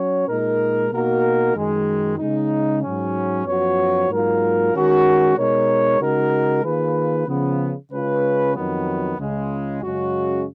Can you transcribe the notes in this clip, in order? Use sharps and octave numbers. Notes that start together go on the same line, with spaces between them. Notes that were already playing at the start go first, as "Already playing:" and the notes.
Already playing: F#3 C#4 F#4 C#5
A#2 G#3 D#4 A#4
B2 A#3 D#4 F#4 A#4
F#2 D#3 G#3
C#3 G#3 D#4
G#2 F#3 C#4
F#2 F3 B3 F#4 C#5
G#2 F#3 A#3 F4 A#4
D#3 G#3 C#4 F#4 A#4
B2 G#3 D#4 A#4 C#5
C#3 G#3 D#4 F#4 A#4
D#3 A#3 F4 G#4 B4
C#3 F3 B3
C#3 G#3 C#4 F4 B4
F2 D#3 F#3 B3
C#2 C#3 G#3
F#2 C#3 G#3 C#4 F#4